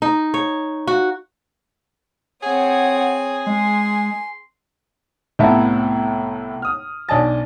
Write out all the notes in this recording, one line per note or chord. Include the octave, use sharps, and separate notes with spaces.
D#4
C#5
F#4
C4 G#4 C#5 F#5 D#6
G#3 G#5 C6
C2 A2 B3 E4 E5 A5
D#6 F6
B1 D4 D#5 G#5 A5 A6